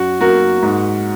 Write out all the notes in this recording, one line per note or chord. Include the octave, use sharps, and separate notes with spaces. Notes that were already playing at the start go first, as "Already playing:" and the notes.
Already playing: F#2 F#4
F#3 A#3 F#4 A#4
G#2